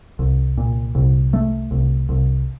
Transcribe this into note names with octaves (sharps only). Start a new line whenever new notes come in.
C2
A#2
C2
A3
C2
C2